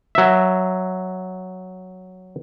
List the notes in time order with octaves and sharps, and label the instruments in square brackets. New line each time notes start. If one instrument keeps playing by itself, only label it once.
[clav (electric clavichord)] F#3 E5